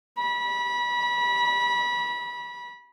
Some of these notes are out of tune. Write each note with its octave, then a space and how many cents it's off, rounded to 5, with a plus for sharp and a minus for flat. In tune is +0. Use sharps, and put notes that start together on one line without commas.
B5 -30